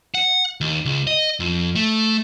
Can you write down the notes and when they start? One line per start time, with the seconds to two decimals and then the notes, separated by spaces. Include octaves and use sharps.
0.15 F#5
0.61 D#2
0.85 C#2
1.07 D#5
1.40 F2
1.75 A3